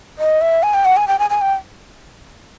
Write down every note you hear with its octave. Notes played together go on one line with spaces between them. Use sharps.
D#5
E5
G#5
G5
F#5
G#5
G5
G#5
G#5
G5